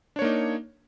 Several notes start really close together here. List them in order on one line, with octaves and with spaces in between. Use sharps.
D4 C#5 A#3 D#4